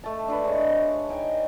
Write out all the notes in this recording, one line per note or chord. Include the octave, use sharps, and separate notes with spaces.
A3 A5
D4 A4 B4
G#3 C#5
A5
D#4 G5 G#5